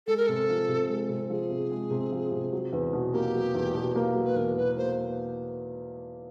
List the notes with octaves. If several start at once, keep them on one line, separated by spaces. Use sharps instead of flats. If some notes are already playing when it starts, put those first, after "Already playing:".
G#3 A4
A#4
C3 A4
F3
C3
G#3
C3
F3 G#4
C3
G#3
C3
F3
C3
F#3
E2
B2
A#3 G4
F#3
E2
B2
A#3
F#3
B4
E2 A#4
B2 B4
A#3 C5